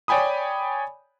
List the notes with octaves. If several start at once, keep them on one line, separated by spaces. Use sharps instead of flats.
C#5 D5 G5 G#5 B5 D#6